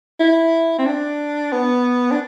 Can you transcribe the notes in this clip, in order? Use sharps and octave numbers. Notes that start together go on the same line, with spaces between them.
E4
C4
D4
B3
D4